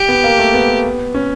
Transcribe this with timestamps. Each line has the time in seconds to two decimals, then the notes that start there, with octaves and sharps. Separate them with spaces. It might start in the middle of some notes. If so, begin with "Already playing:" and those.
Already playing: G4
0.09 B3
0.24 A#3
0.38 A3
0.54 B3
1.15 C#4